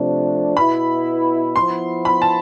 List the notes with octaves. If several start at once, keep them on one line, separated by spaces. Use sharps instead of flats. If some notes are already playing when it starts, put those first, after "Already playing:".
Already playing: C3 F3 A3 D4
B2 B3 E4 B5
F3 B3 E4 C6
B5
A5